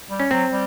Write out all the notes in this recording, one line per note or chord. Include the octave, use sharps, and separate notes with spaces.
G3
C#4
F#3 C4
G3